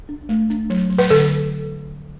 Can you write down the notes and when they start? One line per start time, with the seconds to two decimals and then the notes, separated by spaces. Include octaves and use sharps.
0.09 D4
0.29 A3
0.50 D4
0.70 F#3
0.90 F#3
0.98 B4
1.10 D3 A4